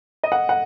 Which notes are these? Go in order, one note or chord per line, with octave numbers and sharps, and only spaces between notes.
D#5
F#5
F#5